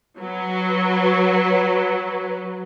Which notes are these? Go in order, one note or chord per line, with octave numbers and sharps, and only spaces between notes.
F#3 B4